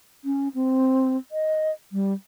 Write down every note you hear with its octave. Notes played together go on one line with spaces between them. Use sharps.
C#4
C4
D#5
G3